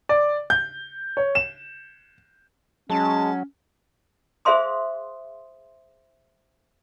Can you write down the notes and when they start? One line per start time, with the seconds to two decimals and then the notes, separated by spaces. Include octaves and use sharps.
0.09 D5
0.50 G6
1.17 C#5
1.35 E7
2.90 F#3 G#3 C#4 A5
4.45 G#4 C5 E5 F5 C6 D#6